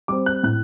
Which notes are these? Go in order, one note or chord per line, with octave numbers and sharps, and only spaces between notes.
G3 C4 D6
F#6
A2 F#6